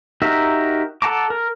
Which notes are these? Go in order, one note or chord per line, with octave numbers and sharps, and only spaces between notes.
D#4 F#4 G4 A#4 E5
A4 F#5 A5 A#5 D6
A#4